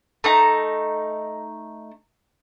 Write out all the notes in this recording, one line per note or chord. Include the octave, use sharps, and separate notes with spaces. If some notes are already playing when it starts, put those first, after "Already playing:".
A3 D#4 A#5